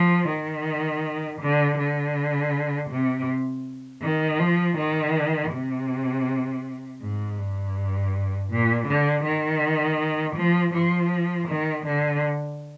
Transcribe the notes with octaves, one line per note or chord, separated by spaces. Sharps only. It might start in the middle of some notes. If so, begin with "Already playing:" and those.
Already playing: F3
D#3
D3
D3
C3
D#3
F3
D#3
C3
G#2
G2
A#2
D3
D#3
F3
F3
D#3
D3